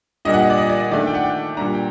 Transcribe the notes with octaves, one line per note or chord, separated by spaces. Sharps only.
A#2 G3 D4 D#5
F#5
D#5
D5
D#5
D5
D#5
D#3 A3 D4 D5
G5
F#5
G5
A#2 G3 D4 A#5
G5